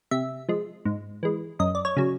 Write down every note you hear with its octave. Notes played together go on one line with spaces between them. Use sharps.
C3 E5
F3 G#3
G#2
E3 G#3
F#2 D#5
D5
C#5
C#3 F#3